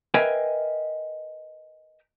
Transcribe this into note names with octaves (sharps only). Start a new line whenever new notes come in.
A#4 B4 D#5 E5 G5 G#5